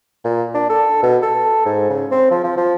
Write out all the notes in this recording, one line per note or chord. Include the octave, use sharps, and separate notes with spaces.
A#2
D4
A4
B2
A4
G#2
C#3
C4
F3
F3
F3